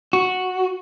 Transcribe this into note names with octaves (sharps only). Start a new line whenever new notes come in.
F#4